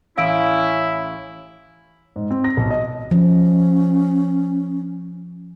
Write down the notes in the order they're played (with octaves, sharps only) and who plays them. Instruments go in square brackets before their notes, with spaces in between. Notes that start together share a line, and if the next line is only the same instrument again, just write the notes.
[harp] A1 D#6 [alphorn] C#4 [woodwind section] E4 [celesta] F5 E6 D7
[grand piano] G#2
C4
A#6
B1
D#5
[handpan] F3 [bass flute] C#4